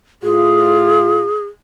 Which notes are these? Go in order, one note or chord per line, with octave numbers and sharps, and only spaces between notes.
A2 F4 G#4